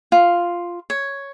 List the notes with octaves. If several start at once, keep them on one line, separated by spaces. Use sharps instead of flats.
F4
C#5